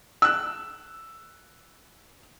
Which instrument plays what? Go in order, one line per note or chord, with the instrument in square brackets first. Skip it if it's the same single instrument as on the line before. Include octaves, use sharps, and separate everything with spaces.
[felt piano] E6 F#6